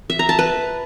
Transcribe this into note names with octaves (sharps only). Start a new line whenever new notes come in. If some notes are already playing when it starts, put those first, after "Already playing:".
E5
A#5
A5
B4